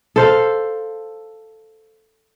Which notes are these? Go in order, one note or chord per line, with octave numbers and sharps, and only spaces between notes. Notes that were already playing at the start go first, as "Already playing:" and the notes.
A4 C5 F5